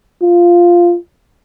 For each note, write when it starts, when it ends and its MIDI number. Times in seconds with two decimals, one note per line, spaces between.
0.22 0.96 65